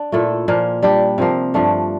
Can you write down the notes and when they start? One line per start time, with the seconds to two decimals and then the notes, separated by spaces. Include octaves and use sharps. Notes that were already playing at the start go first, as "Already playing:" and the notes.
Already playing: D4
0.12 A#2 A3 E4 A4
0.48 A#2 F3 A#3
0.82 G3 D4 G4
1.18 C3 F3 A#3
1.54 G2 F3 A3 D4